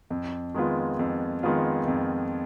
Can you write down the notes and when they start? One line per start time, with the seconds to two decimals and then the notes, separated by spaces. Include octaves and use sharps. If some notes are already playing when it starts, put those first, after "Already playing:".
0.10 F2
0.54 D#3 G#3 B3 F4
0.99 F2
1.43 D#3 G#3 B3 F4
1.88 F2